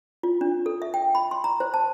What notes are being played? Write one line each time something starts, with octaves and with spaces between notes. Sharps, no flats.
F4
D4
A4
E5
G5
B5
C6
A#5
C5
A5